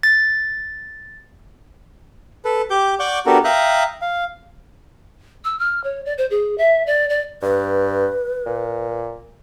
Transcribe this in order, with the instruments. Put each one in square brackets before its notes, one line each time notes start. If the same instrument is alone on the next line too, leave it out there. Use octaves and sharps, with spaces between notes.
[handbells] A6
[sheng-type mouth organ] A4 B4
G4 D6 G6
D5 F#5 C#6 D6 G6
B3 D4 F#4 G4 A4 A#4
E5 F5 G5 A#5 D#6 F#6
F5
[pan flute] E6
F6
C#5
D5
C5
G#4
E5
D5
D5
[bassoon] G2 [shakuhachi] B4
[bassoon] A#2